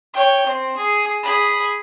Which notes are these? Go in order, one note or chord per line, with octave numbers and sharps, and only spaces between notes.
C#5 G5
C4
G#4
G#4 B5